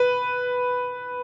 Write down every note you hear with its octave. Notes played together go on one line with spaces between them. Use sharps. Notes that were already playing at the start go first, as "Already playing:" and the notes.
Already playing: B4